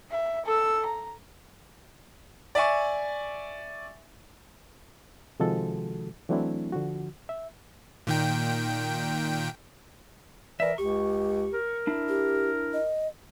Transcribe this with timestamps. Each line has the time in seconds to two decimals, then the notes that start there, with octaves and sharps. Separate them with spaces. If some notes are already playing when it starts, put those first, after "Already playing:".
0.11 E5
0.45 A4 E6
0.85 A#5
2.55 D5 E5 G#5 C#6
5.40 C3 D#3 F3 G#3 F#4 A4
6.29 E3 F#3 A3 C4 D4 E4
6.72 D3 F3 F#4
7.29 E5
8.07 A#2 D#3 G5
10.60 E3 A#4 D5 E5
10.78 C#2 G4 C#6
11.53 A#4
11.87 D4 E4
12.09 G4
12.73 D#5